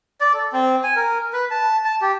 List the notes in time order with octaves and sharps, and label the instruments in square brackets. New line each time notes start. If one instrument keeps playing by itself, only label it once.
[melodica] D5
A4
C4
G#5
A#4
B4
A5
A5
G4